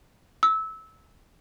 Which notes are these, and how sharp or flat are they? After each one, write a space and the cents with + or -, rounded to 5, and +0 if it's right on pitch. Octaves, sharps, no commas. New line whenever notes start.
E6 -20